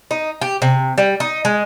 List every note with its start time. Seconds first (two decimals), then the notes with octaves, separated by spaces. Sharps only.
0.11 D#4
0.41 G4
0.62 C3
0.98 G3
1.20 D#4
1.45 G#3